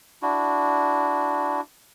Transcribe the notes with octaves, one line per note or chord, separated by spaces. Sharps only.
D4 E4 F#4